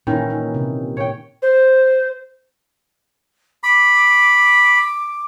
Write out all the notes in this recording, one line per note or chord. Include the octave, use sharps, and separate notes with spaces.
A#2 D#3 E3 C#4 E4
D#4
C3
A#2 C#5 G5
C5
B5 D6